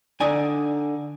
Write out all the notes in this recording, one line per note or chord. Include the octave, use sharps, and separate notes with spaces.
D3 D#4 D5 G#5